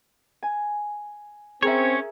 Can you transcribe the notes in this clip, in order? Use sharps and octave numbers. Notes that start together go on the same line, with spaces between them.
G#5
C4 C#4 G#4 A#4 C#5 E5